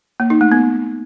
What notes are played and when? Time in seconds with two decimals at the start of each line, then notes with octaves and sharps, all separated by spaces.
0.20 A#3
0.30 D#4
0.41 A3
0.52 B3